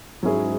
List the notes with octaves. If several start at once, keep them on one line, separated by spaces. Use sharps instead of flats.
G#2 F#3 C#4 E4 G#4